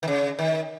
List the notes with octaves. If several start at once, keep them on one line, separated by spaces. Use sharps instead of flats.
D#3
C#3
D#3